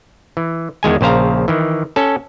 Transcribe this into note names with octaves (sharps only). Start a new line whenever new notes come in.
E3
E2 D#3 G#3 G#5
A#1 C#3 C5 F5 A#5
D#3 E3
C#4 A4